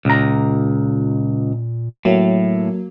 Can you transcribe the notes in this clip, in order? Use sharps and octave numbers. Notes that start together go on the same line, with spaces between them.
C#2 A#2 A#5
A2 F#3 A#3